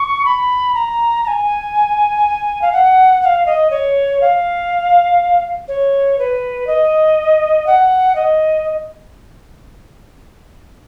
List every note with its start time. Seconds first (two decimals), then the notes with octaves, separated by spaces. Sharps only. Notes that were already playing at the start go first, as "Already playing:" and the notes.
Already playing: C#6
0.25 B5
0.74 A#5
1.24 A#5
1.27 G#5
2.62 F5
2.72 F#5
3.22 F#5
3.25 F5
3.46 D#5
3.70 C#5
4.21 F5
5.68 C#5
6.19 B4
6.67 D#5
7.66 F#5
8.15 D#5